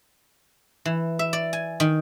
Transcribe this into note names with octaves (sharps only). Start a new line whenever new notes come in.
E3
E5
D5
G#5
D#3